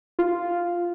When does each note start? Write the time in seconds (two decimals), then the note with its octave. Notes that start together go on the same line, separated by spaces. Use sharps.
0.19 F4